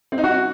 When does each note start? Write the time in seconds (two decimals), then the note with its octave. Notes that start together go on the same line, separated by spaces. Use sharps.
0.12 C4
0.18 D#4
0.24 F#4